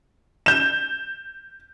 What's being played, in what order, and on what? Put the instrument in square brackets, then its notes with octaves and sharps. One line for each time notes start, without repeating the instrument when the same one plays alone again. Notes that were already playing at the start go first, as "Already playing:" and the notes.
[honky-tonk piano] G6 E7